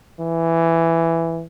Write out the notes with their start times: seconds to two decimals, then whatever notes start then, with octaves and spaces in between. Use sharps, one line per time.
0.20 E3